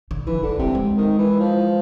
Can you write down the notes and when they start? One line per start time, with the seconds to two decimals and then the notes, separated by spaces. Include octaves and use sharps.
0.11 D3
0.27 E3 F3
0.43 D3 F#3
0.59 C3 G#3
0.75 G#3
0.97 D#3
1.19 E3
1.40 F3